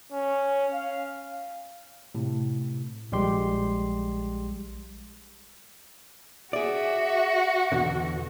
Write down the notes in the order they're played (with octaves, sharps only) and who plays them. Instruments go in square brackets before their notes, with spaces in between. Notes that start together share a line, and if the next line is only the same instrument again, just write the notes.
[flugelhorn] C#4
F5
[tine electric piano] A2 C3
A#1 G3 G#3 G4 C6
[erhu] F#4 [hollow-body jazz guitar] G#4 D5 [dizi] E5
[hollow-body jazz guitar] E2 B2 D3